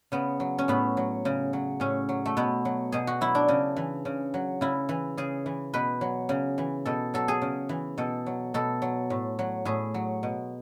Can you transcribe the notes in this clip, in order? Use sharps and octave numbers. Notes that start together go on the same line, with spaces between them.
C#3 B3
F#3
C#4
A2 B3
F#3
C#3
F#3
A2 C#4
F#3
A3
B2 B3
F#3
B2 G#4
F#4
F#3 E4
D4
C#3
E3
C#3
F#3
C#3 E4
E3
C#3 G#4
E3
B2 B4
F#3
C#3
E3
B2 A4
F#3 A4
G#4
C#3
E3
B2 A4
F#3
B2 A4
F#3
A2
F#3
A2 G#4
F#3
B2